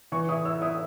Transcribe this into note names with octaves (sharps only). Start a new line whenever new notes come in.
E3 C#6
E4 D#6
E4 E6
E4 D#6